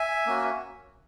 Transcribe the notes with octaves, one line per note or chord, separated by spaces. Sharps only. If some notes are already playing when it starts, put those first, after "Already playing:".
Already playing: E5 G#5
A#3 C#4 F#4